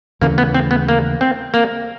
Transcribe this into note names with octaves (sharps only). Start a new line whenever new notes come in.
D#2 C#3 E3 A3 A#3
B3
C4
B3
A#3
C4
A#3